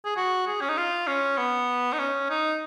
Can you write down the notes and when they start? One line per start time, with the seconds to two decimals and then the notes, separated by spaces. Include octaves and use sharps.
0.05 G#4
0.16 F#4
0.47 G#4
0.61 C#4
0.69 D#4
0.77 F4
1.07 C#4
1.37 B3
1.93 D#4
1.99 C#4
2.30 D#4